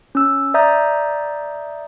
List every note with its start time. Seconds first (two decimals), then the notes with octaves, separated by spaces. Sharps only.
0.15 C#4 E6
0.54 D5 E5 A#5 D#6 G6